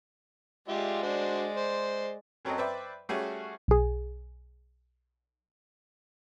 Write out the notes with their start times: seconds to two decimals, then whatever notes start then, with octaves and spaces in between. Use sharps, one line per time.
0.68 G#3 F4 G4 D5 E5
1.02 D4 F#4 C5
1.57 C5
2.45 F#2 F#3 C4 A4 D#5
2.58 B4 C5 D5 E5 G5
3.09 G3 A3 C#4 F#4 G#4
3.68 B1 G#4